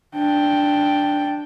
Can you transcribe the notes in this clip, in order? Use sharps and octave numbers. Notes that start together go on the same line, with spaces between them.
D4 G5